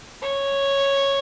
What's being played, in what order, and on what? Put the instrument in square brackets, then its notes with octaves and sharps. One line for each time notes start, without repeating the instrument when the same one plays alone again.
[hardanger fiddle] C#5